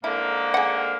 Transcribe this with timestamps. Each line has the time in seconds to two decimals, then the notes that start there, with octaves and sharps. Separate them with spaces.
0.04 G#2 D3 A#3 E4
0.54 G#4 F#5